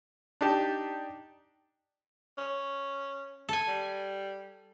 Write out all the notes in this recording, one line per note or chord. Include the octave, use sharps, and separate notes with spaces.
D4 D#4 G4 A5
C#4
A4 G#5
G3